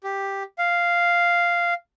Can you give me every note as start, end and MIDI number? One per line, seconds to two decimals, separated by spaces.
0.04 0.43 67
0.58 1.74 77